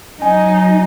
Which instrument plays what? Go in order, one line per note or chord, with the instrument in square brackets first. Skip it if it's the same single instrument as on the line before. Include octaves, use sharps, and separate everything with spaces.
[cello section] F#3 D#4 [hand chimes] G#5